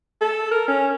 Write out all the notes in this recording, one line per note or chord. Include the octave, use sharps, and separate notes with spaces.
A4
A#4
C#4